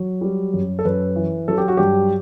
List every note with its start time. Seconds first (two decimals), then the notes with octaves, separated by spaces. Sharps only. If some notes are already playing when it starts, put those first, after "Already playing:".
Already playing: F#3
0.21 G3
0.54 F#2
0.79 A4
0.85 F#2 B4
1.16 E3
1.48 F#3 A4
1.58 G4
1.68 F#4
1.77 G2 G4